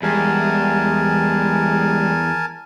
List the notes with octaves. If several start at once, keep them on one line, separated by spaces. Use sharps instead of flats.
E2 G3 G#3 A#4 G#5 A5